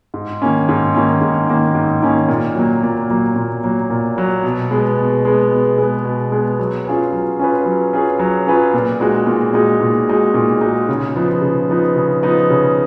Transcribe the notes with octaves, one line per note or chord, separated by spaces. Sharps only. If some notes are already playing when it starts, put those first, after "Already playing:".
G#2
D#3 A#3 C#4
G#2
D#3 A#3 C#4
G#2
D#3 A#3 C#4
G#2
D#3 A#3 C#4
A#2
F#3 A#3
A#2
F#3 A#3
A#2
F#3 A#3
A#2
F#3 A#3
B2
G#3 B3
B2
G#3 B3
B2
G#3 B3
B2
G#3 B3
F#3
C#4 F4 G#4 B4
F#3
C#4 F4 G#4 B4
F#3
C#4 F4 G#4 B4
F#3
C#4 F4 G#4 B4
A#2
G#3 D#4 F#4
A#2
G#3 D#4 F#4
A#2
G#3 D#4 F#4
A#2
G#3 D#4 F#4
C#3
F3 B3 D#4
C#3
F3 B3 D#4
C#3
F3 B3 D#4
C#3